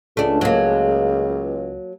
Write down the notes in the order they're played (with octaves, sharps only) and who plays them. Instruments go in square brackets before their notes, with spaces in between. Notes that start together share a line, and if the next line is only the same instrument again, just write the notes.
[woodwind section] C#2 [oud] A3 D4
[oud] F#3 A#3